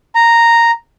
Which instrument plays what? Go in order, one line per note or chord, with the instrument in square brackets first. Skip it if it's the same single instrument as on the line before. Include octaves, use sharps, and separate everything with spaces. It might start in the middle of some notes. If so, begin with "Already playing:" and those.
[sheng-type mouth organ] A#5